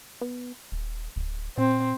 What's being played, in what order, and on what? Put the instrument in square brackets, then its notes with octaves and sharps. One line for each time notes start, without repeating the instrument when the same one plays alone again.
[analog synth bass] B3
D#1
D1
[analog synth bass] A#2 [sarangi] C4